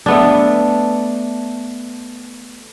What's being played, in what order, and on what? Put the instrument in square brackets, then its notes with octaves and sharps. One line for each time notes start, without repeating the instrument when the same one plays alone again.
[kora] A3 B3 D4